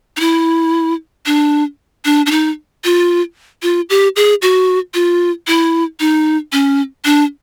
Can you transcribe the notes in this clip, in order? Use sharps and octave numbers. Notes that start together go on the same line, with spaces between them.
D#4
E4
D4
D4
D4
D#4
F4
F4
G4
G#4
F#4
F4
E4
D#4
C#4
D4